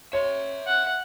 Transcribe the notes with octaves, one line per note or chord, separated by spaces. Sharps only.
C#5 E5 C6
F#5